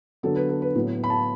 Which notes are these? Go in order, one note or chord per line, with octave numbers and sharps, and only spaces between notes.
D3 F#3 B3 A4
B4
A4
B4
A2 F#3 B3
B5
A5